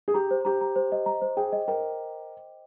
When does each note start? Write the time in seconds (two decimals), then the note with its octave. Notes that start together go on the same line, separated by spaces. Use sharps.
0.08 G#4
0.14 G4 A#5
0.31 C5
0.45 G4 A#5
0.61 A#5
0.76 C5
0.92 D#5
1.06 A#5
1.22 C5
1.37 G#4 G5
1.52 D#5
1.67 A#4 G5